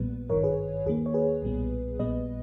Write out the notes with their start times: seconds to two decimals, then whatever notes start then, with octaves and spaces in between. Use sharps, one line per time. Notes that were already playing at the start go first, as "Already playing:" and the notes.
Already playing: A#1 A#2 G3 B3 B4
0.30 G#1 G2 D#3 A#4 C#5
0.44 G#4 B4
0.86 D#2 D#3 A#3 G#4
1.06 C#5
1.14 G#4 B4
1.42 B1 A#2 G3 B3
1.99 A#1 A#2 G3 B3 B4 D#5